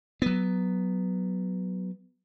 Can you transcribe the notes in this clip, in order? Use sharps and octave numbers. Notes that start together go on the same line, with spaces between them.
F#3 B3